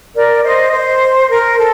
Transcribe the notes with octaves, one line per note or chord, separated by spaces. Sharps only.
A#4 D5
C5 D#5
C5
A#4
A4